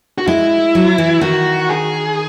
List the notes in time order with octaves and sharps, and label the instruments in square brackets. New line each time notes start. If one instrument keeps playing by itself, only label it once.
[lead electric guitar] F#4
[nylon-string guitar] G#3 [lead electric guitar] E4
[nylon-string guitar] F#3
E3
[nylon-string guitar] D#3 [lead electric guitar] F#4
[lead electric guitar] G#4